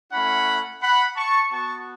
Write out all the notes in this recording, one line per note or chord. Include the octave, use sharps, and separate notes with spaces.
A3 C#4 E4 F#5 B5
F#5 B5
A5 C#6
B3 F#4 A5 C#6